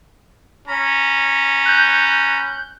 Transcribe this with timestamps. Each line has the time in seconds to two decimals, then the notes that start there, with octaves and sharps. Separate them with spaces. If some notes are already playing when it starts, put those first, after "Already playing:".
0.68 C#4 A#5 B5
1.66 F#6 G6